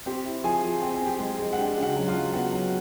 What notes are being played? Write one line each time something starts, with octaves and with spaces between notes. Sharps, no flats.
C4 G4 G5
E4
F3 G#4 G#5
F3
C4 G5
G#5
C4
G4 G5
G#3
G#3
F#5
D4 G4 G5
C#3
F#4 F#5
F#3
F4 F5
F#3
B3 F#4 F#5
F#3